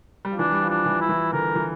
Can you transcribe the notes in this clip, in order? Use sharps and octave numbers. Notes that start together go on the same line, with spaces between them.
G3
F3
E3 D4
G3
F3
D4
E3
E4
E3
D3 A#4
E3